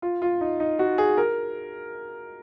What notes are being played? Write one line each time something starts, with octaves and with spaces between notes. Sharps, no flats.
F4
F4
D#4
D#4
F#4
G#4
A#4